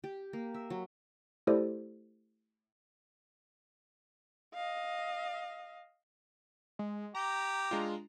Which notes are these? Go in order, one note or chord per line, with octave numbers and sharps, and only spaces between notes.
G4
A#3
E5
F#3
A3 E4 G4 A4 C5 D5
D#5 F5
G#3
G4 A#5
G#3 D4 F4